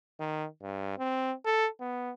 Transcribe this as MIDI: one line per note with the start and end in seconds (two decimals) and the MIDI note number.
0.20 0.46 51
0.62 0.94 43
0.98 1.33 60
1.46 1.68 69
1.80 2.12 59